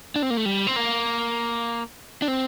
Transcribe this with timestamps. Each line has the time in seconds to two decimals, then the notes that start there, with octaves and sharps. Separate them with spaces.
0.16 D4
0.23 C4
0.30 A#3
0.37 A3
0.45 G3
0.67 C4
0.76 A#3
2.22 D4
2.28 C4